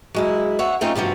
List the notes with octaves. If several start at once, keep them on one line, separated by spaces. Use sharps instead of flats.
F#3 G#3 E4
C#5 E5 F#5
A3 C4 C#4 D#4 F4
G2 C3 F3 F#3